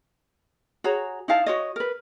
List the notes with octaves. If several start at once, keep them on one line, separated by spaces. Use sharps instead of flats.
F#4 G#4 C#5 A#5
D#4 E4 F5 A5
F#4 C#5 D#5
A#4 B4